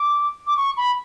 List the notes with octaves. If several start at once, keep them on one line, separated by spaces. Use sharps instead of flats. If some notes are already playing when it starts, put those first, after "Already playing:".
Already playing: D6
D6
C#6
B5